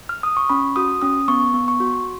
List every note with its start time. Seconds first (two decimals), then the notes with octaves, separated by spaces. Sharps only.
0.09 F6
0.23 D#6
0.37 C#6
0.49 C#4 B5
0.76 F#4 D#6
1.02 C#4 D#6
1.28 B3 C#6
1.54 B3
1.68 C#6
1.80 F#4